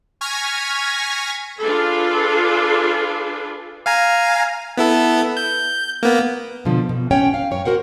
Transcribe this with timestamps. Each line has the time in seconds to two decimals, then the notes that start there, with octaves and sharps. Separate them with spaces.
0.21 G#5 C#6 F6 G#6 A#6 B6
1.60 D4 F4 G#4 A4 B4
3.86 F5 G#5 A#5
4.77 B3 E4 A4
5.37 G6
6.03 A#3 B3
6.65 B2 D3 F3
6.89 B2
7.11 C#4 C#5 F#5 G5
7.34 F5
7.51 F#2 C#5
7.65 F#4 A#4 C5 F#5